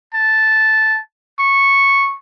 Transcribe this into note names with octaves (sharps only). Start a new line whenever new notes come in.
A5
C#6